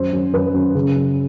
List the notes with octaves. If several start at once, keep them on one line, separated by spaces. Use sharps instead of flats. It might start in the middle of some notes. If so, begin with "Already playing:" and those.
Already playing: F#2 C5
F#2
F#2 B4
F#2
C#3
F#2